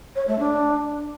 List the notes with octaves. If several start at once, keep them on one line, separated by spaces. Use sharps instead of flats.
C#5
A3
D4